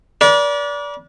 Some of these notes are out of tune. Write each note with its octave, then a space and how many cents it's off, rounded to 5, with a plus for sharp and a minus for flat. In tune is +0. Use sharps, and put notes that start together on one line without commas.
B4 -45 D5 -25